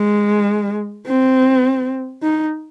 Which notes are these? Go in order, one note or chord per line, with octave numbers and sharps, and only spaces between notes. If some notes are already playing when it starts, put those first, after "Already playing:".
Already playing: G#3
C4
D#4